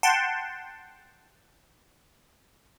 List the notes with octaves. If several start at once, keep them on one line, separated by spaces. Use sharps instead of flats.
F#5 G5 A5 C6